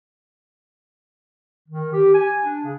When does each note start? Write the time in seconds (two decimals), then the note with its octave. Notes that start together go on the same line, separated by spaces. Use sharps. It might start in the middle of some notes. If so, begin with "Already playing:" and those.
1.68 D#3
1.93 G4
2.14 G#5
2.41 D4
2.65 C#3